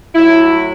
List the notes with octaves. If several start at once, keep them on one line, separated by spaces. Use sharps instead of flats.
A2 F#3 E4